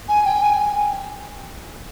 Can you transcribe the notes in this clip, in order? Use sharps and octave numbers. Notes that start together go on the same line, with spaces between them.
G#5
G5
G#5